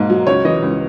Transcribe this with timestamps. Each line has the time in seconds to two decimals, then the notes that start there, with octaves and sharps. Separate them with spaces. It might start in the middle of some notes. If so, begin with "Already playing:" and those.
Already playing: G#2 B2 A#3
0.10 F#3
0.27 C#2 C#5
0.45 E3 D#5
0.62 C#2